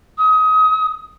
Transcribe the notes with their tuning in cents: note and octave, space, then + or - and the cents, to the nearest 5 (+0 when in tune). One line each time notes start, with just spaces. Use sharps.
D#6 +25